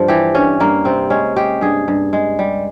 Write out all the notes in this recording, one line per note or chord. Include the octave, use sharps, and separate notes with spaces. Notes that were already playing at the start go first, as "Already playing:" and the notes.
Already playing: G2 F3
E3 G4
G2 C#4
G2 A#3
C3 C4
G#3 C#4
G#3 G4
G2 G#4
G2
G#3
G3